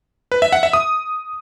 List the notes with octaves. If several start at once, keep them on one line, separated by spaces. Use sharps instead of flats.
B4
E5
F#5
E5
D#6